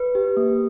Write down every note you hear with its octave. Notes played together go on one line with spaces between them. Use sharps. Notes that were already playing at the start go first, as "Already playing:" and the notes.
Already playing: B4
G4
A#3